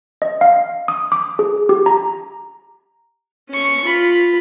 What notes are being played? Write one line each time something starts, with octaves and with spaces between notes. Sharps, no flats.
D#5
F5
D#6
D6
G#4
G4
A#5
C#4 C#6
F4 B5